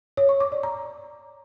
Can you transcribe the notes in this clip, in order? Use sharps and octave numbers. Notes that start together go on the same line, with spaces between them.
C#5
C#6
D6
D5
A#5